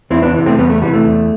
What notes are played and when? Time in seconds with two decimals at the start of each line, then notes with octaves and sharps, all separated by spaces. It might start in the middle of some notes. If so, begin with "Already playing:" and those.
0.10 E2 C4 E4
0.22 B3 D4
0.34 C3 E3
0.46 A3 C4
0.58 E2 G3 B3
0.70 A3
0.82 C3 E3 G3
0.93 A3
1.05 E2